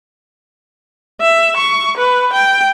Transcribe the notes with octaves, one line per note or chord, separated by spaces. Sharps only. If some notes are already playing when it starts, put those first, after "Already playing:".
E5
C#6
B4
G5